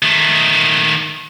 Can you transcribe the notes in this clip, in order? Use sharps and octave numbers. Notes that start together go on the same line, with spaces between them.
D#3 A3